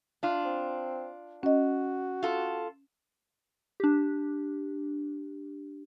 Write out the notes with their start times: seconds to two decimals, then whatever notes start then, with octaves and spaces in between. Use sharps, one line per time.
0.23 D4 F4
0.45 C4
1.43 C#4 F#4 D#5
2.23 F4 A4
3.80 D4 G4